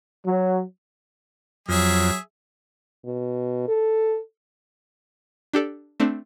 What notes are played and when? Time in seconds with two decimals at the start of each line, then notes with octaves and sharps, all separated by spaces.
0.25 F#3
1.69 F2 F#3 G#4 E5
3.05 B2
3.68 A4
5.53 D4 G4 A4 D5
6.00 A3 C4 D4